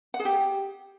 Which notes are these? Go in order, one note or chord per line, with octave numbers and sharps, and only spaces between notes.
F#5
G#4
G4